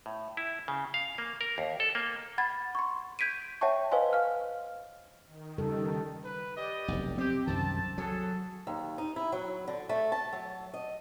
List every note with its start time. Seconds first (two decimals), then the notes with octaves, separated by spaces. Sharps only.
0.06 A2
0.37 E4
0.68 C#3
0.94 F5
1.18 A#3
1.41 A#4
1.58 D#2
1.80 A4
1.95 A#3
2.38 F#5 B5 G#6 A6
2.75 C6 C#6
3.19 G6 G#6 B6 D7 D#7
3.61 C#5 E5 F#5 G5 A5 C#6
3.91 B4 C5 D#5 F5 G#5 C6
4.13 F5 F6
5.26 D#3
5.58 C#3 G3 A4
6.25 B4
6.56 G4 D5 D#5
6.88 F1 B1
7.18 C4 G4
7.47 C2 F#2 D#3 C4 A5
7.98 F#3 F#4 G#4 A4
8.67 D#2
8.98 D#4
9.16 E4
9.32 F#3
9.68 D3
9.89 A3
10.12 A5
10.32 F#3
10.74 D#5